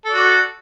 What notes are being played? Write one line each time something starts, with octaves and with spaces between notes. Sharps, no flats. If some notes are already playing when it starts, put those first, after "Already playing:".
F#4 A4 D5